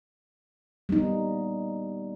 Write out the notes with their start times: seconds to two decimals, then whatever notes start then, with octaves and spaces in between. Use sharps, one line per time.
0.89 G3 A#3 B3 D#4